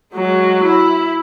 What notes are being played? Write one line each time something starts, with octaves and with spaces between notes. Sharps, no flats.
F#3 G#3
E4